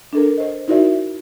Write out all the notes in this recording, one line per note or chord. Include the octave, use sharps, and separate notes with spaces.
D4 A4 A#4
C5 D#5
D#4 E4 F#4 A#4 D5 E5